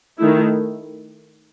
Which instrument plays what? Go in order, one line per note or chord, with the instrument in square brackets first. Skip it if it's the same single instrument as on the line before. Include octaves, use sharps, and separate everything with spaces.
[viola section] D#3 A3 E4